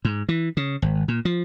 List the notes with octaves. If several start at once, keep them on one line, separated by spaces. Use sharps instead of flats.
G#2
E3
C#3
G#1
A#2
F3